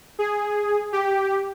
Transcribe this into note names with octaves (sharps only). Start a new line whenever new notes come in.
G#4
G4